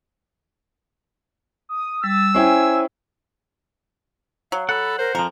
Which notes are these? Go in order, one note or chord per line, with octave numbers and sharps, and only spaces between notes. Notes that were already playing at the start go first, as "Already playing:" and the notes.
D#6
G3 E6 A6
C#4 E4 C5 G5 G#5
F#3 F5
A4 F#5 B5
A#4 C5
F2 F3 A#4 A#5